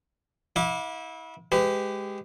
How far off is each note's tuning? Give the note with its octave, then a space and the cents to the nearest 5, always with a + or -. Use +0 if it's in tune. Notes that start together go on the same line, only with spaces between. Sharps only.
E4 -25 F5 +45 D6 +0
G#3 +0 G4 +0 B4 +35